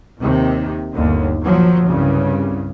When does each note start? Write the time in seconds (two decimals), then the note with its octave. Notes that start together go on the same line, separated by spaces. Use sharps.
0.20 D#2 C3 D#3
0.94 G1 D#2 D3
1.43 A#2 F3 F#3
1.85 C2 G2 C#3